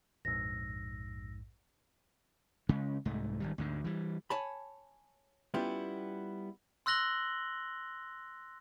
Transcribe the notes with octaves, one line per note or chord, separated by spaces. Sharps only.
A#1 F2 G#2 E6 A#6
C#3 G#3 C#4
C2 G#2 A3
G#1 D#3 G3
D2 G#2 D3
E3 G3
C#5 G#5 A5 B5
G3 B3 C#4 E4 F4 G4
C6 E6 F#6 A#6 F#7 G7